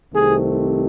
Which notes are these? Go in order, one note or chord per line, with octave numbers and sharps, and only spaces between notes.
C2 C3 D#3 A3 C4 G#4